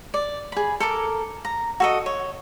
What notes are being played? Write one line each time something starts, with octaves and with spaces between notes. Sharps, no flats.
D5
G#4 B5
A4 A#4 D6
A#5
F#4 A4 D#5
C#5